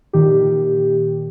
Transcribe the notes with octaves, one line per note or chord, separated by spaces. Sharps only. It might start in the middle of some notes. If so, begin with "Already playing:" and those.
A#2 D#3 G4